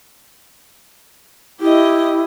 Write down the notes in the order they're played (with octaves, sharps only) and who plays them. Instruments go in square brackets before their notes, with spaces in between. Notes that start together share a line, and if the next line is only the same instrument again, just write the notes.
[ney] E4 [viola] G4 D#5